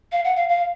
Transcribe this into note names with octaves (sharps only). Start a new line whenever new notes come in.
F5
F#5
F5
F5